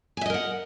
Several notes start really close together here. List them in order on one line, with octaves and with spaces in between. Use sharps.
G#5 E5 D#5 A#4 F#5